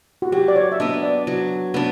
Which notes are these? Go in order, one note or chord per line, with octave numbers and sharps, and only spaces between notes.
F#4
F#3 G4
D5
C#5
E5
B3 D4 D#5
D5
F#3
B3 D4